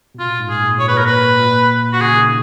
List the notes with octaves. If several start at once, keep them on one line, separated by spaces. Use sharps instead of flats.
B2
A#2 F4
G#2
G#4
A#2
A#2 C#5
B4
A#2 A#4
A#2 B4
A#2
A#2
F#4
C#3 G#4
D#3
C#3